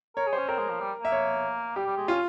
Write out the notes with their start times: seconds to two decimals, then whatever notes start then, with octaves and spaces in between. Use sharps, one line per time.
0.16 A#4 C#5
0.27 G#4
0.33 C#4 C5
0.48 C4 A#4
0.59 G#3
0.70 F3
0.80 G3
1.02 A#3 E5
1.12 C#5
1.76 G3 G4
1.86 G3
1.97 G#3
2.08 C#4 F4